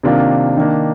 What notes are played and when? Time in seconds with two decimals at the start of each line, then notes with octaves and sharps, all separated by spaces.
0.03 C3 D#3 A#3 D4 F4
0.57 D#3 A#3 D4